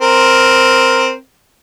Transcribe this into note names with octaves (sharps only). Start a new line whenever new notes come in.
C4 A#4